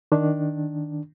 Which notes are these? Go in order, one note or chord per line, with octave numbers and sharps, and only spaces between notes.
D#3 D4